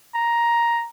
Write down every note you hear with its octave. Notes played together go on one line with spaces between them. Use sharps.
A#5